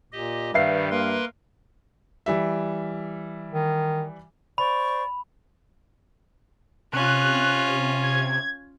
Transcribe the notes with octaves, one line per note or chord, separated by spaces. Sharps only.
A#2 G4 D#5
G2 D#3 G3 B4 E5 F5 C7
A#3 A#4 B4 C6
E3 G3 E5
D#3
C5 D5 B5 C#6
C3 C#4 F4 F#6
G#6